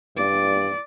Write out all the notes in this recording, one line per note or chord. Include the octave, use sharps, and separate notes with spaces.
G2 D5